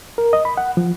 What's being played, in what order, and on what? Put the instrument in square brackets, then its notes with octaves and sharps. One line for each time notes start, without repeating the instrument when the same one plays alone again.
[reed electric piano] A#4
D#5
B5
F#5
F3